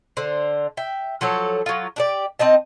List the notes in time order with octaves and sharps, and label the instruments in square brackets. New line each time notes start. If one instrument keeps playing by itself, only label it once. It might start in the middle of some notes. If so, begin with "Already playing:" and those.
[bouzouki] D3 C5
E5 G5
F3 F#3 A4 C#5
F#3 F4
D4 G4 D5
C4 D#4 D#5 A5